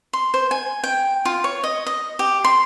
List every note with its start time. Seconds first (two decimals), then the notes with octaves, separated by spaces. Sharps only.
0.13 C6
0.34 C5
0.51 G#5
0.84 G5
1.25 F4
1.44 C#5
1.63 D#5
1.86 D#5
2.19 G4
2.45 C6